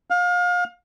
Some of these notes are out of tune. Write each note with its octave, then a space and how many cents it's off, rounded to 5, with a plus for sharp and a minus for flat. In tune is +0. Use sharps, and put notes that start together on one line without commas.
F5 +30